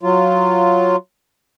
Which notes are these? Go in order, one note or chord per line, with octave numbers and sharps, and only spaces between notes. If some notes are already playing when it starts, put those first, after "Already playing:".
F#3 F4